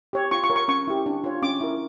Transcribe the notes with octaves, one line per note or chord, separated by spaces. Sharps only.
G4 C#5
F4 C#6
C#6
A#4 C#5
C#6
C#4 C#6
E4 G4
D4
F4 C#5
C#4 D6
E4 A#4